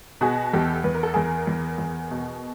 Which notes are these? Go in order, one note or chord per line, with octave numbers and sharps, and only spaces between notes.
B2 F#4 G#4
E2 G4 A4
E2 B4
A#4
A4
E2 G#4 A#4
E2
E2
B2